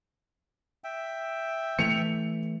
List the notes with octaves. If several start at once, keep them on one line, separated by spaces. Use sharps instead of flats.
E5 G5
E3 A3 C#7 F7